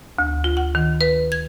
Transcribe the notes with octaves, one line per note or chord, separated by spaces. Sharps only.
D2
F4
F#5
D#3
B4
G#6